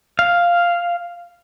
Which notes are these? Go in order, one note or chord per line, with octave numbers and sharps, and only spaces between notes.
F5